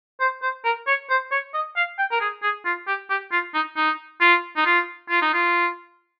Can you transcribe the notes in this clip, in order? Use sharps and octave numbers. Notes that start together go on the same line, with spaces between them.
C5
C5
A#4
C#5
C5
C#5
D#5
F5
G5
A#4
G#4
G#4
F4
G4
G4
F4
D#4
D#4
F4
D#4
F4
F4
D#4
F4